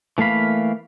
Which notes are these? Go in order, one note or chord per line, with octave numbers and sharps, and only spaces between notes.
E3 A3 A#3 F5 B5